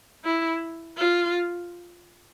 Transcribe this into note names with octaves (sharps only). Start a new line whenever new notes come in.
E4
F4